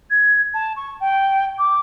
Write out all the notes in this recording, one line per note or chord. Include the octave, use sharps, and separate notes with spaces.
G#6
A5
C#6
G5
D6